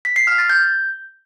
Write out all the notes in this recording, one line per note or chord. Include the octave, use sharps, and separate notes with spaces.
B6
C7
F6
A6
G6